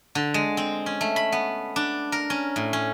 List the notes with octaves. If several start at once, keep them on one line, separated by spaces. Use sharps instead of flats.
D3
G#3
C4
C#4
A3
B5
B3
D4
A#4
C#4
A2
C#4